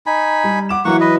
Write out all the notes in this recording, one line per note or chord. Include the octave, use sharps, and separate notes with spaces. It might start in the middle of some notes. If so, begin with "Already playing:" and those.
D#4 G#5 B5
G3
F#5 D6 E7
E3 F#3 A#3 E4 F#5 C#6
B4 D#5